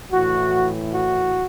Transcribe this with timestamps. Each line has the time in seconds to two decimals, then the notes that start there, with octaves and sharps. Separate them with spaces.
0.11 A2 E3 F#4
0.93 F#4